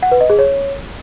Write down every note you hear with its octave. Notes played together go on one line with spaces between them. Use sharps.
F#5
B4
D#5
G#4
C#5